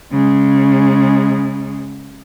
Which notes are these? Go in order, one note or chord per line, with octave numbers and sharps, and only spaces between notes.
C#3 G#3